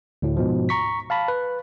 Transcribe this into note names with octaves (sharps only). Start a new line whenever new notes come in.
D2 A2
G#2 B2 F3
A#5 C#6 B6
F5 A5 B5
B4